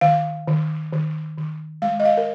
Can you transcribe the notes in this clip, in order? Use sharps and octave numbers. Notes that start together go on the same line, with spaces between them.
D#3 F5
D#3
D#3
D#3
G#3 F5
D#5
F5
A#4